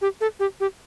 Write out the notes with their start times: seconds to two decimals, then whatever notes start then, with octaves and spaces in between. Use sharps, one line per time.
0.02 G4
0.21 A4
0.40 G4
0.60 G4